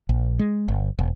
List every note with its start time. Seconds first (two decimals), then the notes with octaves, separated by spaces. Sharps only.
0.09 A#1
0.39 G#3
0.68 G1
0.99 E1